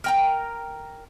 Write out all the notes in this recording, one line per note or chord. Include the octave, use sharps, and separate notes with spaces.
A#4 G5 A#5